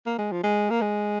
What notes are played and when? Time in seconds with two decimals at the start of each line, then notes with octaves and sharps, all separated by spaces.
0.06 A#3
0.18 G#3
0.32 F3
0.43 G#3
0.70 A#3
0.81 G#3